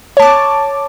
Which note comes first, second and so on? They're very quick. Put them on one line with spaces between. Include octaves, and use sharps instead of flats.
C#5 A5 D6